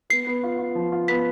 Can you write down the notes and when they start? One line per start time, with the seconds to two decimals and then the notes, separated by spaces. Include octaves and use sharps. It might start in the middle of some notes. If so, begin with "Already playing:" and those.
0.10 B3 C7
0.27 B3
0.43 F4
0.59 F4
0.75 F3
0.92 F4
1.08 B3 B6